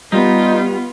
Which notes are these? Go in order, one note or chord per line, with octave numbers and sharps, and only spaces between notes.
G3 B3 D#4 F4